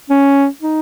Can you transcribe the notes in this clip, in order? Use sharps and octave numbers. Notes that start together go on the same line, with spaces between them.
C#4
D#4